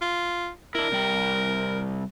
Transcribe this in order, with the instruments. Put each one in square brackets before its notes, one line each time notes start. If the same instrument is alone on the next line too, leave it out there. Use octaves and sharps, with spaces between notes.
[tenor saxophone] F4
[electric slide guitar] D4 E4 [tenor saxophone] A#4
[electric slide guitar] C3 G3 G5